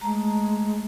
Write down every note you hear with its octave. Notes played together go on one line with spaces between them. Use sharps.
G#3 A3 A#5